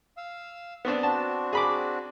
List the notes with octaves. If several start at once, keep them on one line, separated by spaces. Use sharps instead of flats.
F5 E6
B3 C4 D4
C4 D4 F#4 A5
G#4 B5 D6